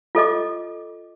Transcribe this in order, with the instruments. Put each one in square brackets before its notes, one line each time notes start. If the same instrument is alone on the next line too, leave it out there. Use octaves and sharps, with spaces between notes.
[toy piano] F4 A4 D#5 D6